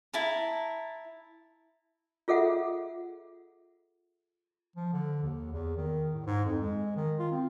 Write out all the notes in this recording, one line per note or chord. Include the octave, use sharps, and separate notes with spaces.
E4 A5 A#5
F4 G#4 A4 E5 F#5
F3
D3
D#2
E2
D#3
A2
G#2
F2
G#3
D#3
F4
C4